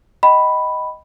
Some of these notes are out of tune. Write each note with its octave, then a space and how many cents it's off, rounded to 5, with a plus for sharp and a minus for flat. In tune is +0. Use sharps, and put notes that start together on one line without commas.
D#5 +5 G5 -25 B5 +0